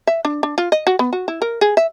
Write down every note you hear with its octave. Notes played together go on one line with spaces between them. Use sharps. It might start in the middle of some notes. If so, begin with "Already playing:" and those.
E5
D4
D4
F4
D#5
F#4
B3
F#4
E4
A#4
G#4
E5